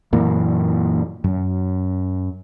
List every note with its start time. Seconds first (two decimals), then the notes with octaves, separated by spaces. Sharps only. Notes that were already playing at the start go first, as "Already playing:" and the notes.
0.13 F#2 A#2 E3 A#3
1.24 F#2